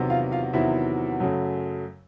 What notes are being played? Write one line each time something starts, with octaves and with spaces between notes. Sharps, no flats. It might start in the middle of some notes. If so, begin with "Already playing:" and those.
Already playing: E2 C3 D#3 F#3 B3
F4 F5
F4 F5
E2 C3 D#3 F#3 B3 E4 E5
F#2 C#3 F#3 A3